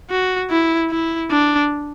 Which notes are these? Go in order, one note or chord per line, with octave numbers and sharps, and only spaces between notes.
F#4
E4
E4
D4